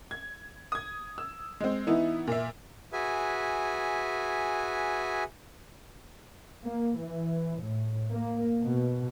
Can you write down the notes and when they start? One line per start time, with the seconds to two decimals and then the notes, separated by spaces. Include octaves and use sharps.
0.11 G#6
0.72 D#6 G#6
1.18 E6
1.60 G#3 C4
1.87 E3 B3 D#4 E4
2.27 A#2 E5
2.93 F#4 G#4 B4 E5 G#5
6.66 A#3
6.98 E3
7.60 A2
8.10 A#3
8.61 B2